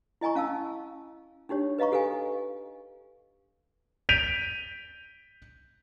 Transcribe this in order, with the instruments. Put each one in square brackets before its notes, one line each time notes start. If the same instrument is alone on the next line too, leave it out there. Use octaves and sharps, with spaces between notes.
[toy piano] E4 D#5 G#5 A#5 C#6
C#4 F5 A5 E6
D4 D#4 G4 C#5
B4 D#5 F5 A#5 C#6
G4 A4 B4 F5 G#5
[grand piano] G6 B6 D7 D#7 F7